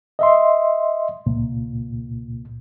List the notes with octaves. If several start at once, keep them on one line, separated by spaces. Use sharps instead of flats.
D#5 E5 C6
C#2 A#2